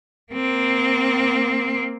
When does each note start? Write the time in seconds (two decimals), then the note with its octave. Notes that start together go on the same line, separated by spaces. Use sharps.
0.33 A#3 C4